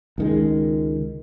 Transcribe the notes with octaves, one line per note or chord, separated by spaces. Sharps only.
C#2 D#3 G#3